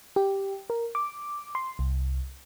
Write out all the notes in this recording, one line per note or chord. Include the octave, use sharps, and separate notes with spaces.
G4
A#4
D6
C6
C2